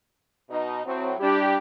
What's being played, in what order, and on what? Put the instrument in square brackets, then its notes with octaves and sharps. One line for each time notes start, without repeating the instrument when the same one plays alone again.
[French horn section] B2 D#4
[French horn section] A2 F#3 [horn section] C4
[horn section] G3 D4 E4 [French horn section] G4